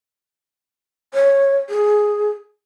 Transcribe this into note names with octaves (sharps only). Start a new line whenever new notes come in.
C#5
G#4